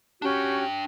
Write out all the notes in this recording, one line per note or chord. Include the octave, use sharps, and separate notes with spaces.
C#4 D4 F#4 G4 G5